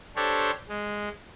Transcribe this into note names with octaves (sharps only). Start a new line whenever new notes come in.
D4 G4 A4 C5 C#5
G#3